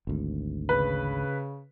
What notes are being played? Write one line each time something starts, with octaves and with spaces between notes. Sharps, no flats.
G#1 D2
C#3 B4